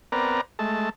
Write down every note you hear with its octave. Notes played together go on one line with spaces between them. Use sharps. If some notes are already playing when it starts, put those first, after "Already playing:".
B3 C4 A#4 B4 D5 A#5
G#3 A3 A5